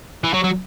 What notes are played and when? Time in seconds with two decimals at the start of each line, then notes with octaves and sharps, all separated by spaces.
0.24 E3
0.34 F#3
0.44 F#3